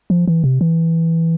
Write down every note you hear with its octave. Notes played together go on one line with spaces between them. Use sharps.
F3
E3
C3
E3